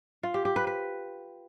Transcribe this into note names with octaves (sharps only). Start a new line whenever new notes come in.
F4
G4
G4
B4
B4